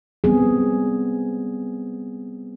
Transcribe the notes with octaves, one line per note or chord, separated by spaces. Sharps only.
G3 B3 C4 G#4